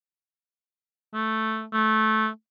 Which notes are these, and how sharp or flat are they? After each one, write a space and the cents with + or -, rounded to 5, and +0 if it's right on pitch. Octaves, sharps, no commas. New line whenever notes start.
A3 +0
A3 -15